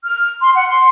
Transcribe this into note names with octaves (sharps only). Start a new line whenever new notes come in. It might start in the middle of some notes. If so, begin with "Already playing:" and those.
F6
C6
F#5
C6